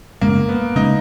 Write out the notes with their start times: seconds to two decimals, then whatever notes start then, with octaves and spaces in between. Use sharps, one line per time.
0.21 F#2 C#3 G#3 A#3 C#4
0.49 B3
0.75 C#3 G#3 C#4 D#4